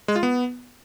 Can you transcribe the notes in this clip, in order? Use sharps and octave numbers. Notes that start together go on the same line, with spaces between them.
G#3
F4
B3